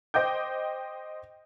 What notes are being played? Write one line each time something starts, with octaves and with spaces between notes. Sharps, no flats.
C5 D#5 G5 D6 G6